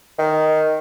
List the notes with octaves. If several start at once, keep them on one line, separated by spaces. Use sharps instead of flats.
D#3